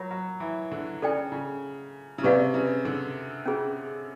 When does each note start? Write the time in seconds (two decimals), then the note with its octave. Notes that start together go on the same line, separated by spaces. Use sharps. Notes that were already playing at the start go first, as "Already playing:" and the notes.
Already playing: F#3 F4 A#4 C#5
0.11 F#3
0.40 E3
0.72 D3
1.02 C#3 A4 D5 G5
1.32 C#3
2.18 C#3
2.23 C3 G4 B4 D5 F5
2.54 C#3
2.85 D3
3.46 C#4 F4 G#4